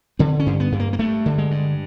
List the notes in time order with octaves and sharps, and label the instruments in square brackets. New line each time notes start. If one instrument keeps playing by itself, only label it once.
[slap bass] D3 C4
C#4
G2
B3
G2
A#3
A#3
G2 A3
D3
G#3
G2